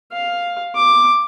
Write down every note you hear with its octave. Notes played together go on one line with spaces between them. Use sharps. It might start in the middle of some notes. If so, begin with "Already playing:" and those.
F5
D6